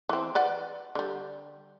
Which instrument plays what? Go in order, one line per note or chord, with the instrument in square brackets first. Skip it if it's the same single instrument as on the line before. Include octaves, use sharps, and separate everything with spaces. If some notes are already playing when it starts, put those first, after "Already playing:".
[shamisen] E3 C4
B4 D5 F#5
D3 G3